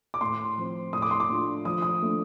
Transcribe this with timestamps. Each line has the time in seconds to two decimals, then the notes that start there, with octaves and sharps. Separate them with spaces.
0.14 D6
0.21 A2 C6
0.58 F3 C4
0.93 A2 D#6
1.02 D6
1.11 C6
1.20 D6
1.29 A3 D4 F4
1.65 F3 D#6
1.82 D#6
2.02 A3 D4